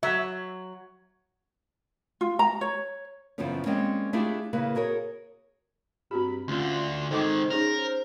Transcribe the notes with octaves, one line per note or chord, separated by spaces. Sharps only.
F#3 E5
F4
A#5
C#5
F#2 C#3 E3 F3 B3 C#4
G3 G#3 A#3 C4 C#4
A3 D4 E4 F4 G4 G#4
C#3 A#3 E4 B4
F#4 G#4 A#4 C#5
G2 C4 F#4 G4 B5
D2 D3 C#4 F4 C6
D#3 G#3 D#4 A4 C5 G5 D6
C#4 D#4 G#4 A#4